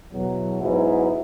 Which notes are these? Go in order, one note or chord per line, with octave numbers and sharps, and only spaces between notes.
E2 B2 F#3
G#2 F#3 B3 E4